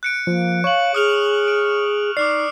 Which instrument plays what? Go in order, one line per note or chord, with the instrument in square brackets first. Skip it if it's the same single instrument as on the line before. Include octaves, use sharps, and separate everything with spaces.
[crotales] F#6 C#7 D7
[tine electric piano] F3 [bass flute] A#3
[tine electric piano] C#5 [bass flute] F5 [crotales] C#6 F#7
[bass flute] G#4 [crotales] D#6 F6 F7
[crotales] D7
[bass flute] D#4 [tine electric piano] D5 [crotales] D6 F6 C7